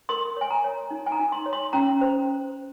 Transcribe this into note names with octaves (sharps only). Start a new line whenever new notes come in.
A#4 C6
C#5 G#5
A#5
C#5
D#4
G#5
A#5
D#4
C6
C#5
C6
C#4 A#5
C5